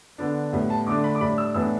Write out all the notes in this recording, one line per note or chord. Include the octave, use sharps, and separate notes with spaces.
D3 B3 D4
A2 G3 B3
A5
D3 A3 D4 D6
B5
D6
A2 G3 D4 B5
E6
A2 E3 B3 D4 E6